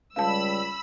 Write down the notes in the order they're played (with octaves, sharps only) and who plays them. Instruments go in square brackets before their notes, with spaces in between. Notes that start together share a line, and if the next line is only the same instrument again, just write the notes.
[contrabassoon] C#2 [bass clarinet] G3 [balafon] F5 A5 [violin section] B5 E6